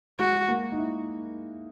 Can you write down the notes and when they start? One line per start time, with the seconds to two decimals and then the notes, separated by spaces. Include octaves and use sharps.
0.19 G#3 F#4
0.49 A#3
0.72 D#4
0.78 E4